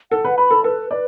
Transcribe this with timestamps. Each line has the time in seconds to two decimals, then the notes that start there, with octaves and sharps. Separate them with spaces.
0.11 A4 F#5
0.25 B4
0.38 B4 B5
0.51 A4
0.64 A4 B4
0.91 B4 D5